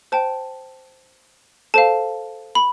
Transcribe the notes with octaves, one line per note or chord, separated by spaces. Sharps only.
C5 G5 A5
A4 C5 F5 A5
B5